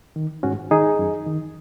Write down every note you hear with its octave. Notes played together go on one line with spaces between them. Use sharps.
D#3
G#2 C#4 F#4
D#3 D#4 G#4
F#2
D#3